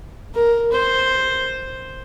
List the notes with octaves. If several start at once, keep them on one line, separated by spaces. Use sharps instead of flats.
A#4
C5